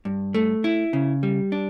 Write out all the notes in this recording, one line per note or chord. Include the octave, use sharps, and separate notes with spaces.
G2
A3
E4
C#3
G3
D4